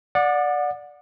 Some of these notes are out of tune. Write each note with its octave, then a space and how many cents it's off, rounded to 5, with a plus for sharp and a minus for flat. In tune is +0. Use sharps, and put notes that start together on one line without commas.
D5 +0 F#5 -25 D6 +45